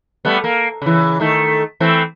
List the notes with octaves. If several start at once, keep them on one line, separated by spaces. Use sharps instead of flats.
G3 A3 B3
A#3
C#3 E3
D#3 A3
E3 A3 C4